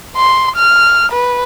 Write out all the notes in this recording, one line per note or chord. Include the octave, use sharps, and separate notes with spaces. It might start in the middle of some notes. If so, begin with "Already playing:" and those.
C6
F6
B4